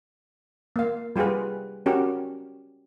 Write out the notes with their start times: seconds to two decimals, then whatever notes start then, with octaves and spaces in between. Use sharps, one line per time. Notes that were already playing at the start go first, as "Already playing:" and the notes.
0.76 A#3 F5
1.16 G3 F4 G4 G#4 B4
1.86 C#4 F#4 G4 A#4